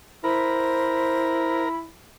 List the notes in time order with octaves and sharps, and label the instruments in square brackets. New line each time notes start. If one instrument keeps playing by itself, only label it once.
[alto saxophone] E4 [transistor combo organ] A#4 [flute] C5 [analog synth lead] B5